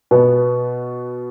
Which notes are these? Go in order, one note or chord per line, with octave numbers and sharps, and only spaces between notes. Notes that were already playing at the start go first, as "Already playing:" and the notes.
B2 B3